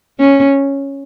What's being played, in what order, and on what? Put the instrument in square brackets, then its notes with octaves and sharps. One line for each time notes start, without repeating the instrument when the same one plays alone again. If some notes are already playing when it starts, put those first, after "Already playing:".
[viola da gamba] C#4